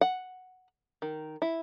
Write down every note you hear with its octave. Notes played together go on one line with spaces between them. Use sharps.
F#5
D#3
E4